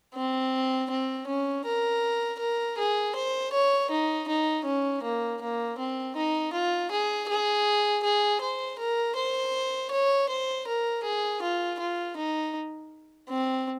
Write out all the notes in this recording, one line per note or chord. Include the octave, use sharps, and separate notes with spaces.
C4
C4
C#4
A#4
A#4
G#4
C5
C#5
D#4
D#4
C#4
A#3
A#3
C4
D#4
F4
G#4
G#4
G#4
C5
A#4
C5
C#5
C5
A#4
G#4
F4
F4
D#4
C4